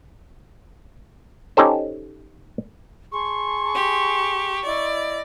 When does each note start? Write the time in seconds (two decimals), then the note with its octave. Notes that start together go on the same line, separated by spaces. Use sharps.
1.57 C#4 D#4 G4 A4 C5
3.12 G#4 A5 C6 C#6
3.74 G4
4.65 E4 D5 D#5